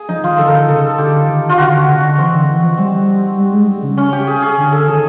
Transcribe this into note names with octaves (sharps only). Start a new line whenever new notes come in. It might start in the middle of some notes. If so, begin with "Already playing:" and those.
Already playing: G#4
F3 D#4
D#3 F4
D3 A4
A#4
A4
C#3 A4
D3 G4
D#3
F4
D3 F#4
D3
C#3
D3
E3 C4
D3
E3
F3
G3 C4
G3
G#3
G3
C#3
C#4
G4
G#4
G#4
D3
A4
D#3 G#4